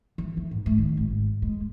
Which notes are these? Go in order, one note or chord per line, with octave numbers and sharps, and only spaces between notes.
E3
E3
G#2
A3
D#3
G#1
G#3